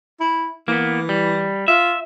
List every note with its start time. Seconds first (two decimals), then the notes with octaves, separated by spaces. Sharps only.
0.20 E4
0.68 E3 A#3 B3
1.09 G3
1.68 F4 E5